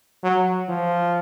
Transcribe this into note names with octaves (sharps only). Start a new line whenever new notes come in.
F#3
F3